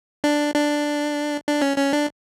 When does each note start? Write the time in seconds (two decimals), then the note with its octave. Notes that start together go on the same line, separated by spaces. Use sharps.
0.24 D4
0.54 D4
1.47 D4
1.62 C#4
1.78 C#4
1.93 D4